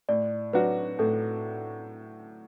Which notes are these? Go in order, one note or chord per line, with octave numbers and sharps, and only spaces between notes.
A2 D5
F#3 D4 F#4 B4
A2 A4